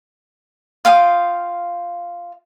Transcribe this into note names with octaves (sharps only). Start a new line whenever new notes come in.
F4 F5 G5 D#6